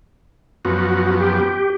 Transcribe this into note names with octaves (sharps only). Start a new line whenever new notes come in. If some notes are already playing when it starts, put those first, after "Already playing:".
F#2 F3 B3 F#4
G4